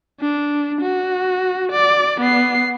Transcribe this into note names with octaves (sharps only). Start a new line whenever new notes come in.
D4
F#4
D5
B3 C7